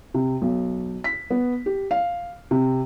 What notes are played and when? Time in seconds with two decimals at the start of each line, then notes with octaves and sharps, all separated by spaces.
0.14 C3
0.42 B1
1.04 B6
1.30 B3
1.66 G4
1.91 F5
2.51 C3